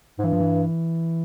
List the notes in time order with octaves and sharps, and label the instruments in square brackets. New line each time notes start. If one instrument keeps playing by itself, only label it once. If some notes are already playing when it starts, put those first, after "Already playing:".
[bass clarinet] G#2
[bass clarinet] G2 [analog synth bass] E3
[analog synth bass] F3
E3